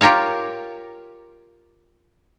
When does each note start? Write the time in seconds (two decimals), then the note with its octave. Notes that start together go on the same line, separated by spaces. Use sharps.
0.01 F4 G4 A#4 C#5 F5